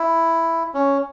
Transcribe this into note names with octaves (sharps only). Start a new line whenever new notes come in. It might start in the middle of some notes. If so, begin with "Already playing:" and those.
Already playing: E4
C#4